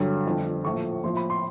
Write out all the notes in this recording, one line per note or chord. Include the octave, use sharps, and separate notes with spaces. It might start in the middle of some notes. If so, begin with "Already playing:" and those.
Already playing: G2 D3 F#3
G1 F2 D3
A#1 A2 F3 A3 C#6
A#1 A2 F3 C6
B5
C6